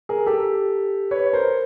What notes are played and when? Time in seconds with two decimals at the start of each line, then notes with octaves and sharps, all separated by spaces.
0.09 G#4 A#4
0.26 G4 A4
1.11 B4 C#5
1.33 A#4 C5